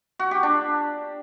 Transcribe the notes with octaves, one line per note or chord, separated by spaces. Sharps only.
F#4
G4
D4